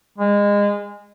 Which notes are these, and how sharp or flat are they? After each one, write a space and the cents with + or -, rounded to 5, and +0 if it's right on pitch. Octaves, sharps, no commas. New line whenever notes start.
G#3 -25